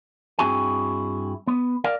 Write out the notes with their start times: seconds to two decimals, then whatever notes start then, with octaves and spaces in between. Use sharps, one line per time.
0.39 G2 C4 E4 F#4 G#4 G#5
1.47 B3
1.84 A#4 D5 F5